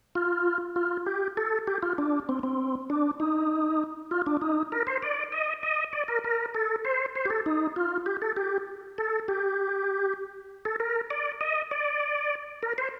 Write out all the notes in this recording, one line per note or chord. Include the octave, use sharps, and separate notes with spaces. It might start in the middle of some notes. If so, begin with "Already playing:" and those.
F4
F4
G4
A4
G4
F4
D4
C4
C4
D4
D#4
F4
D4
D#4
A#4
C5
D5
D#5
D#5
D5
A#4
A#4
A4
C5
C5
G4
A4
D#4
F4
G4
A4
G4
A4
G4
A4
A#4
D5
D#5
D5
A#4
C5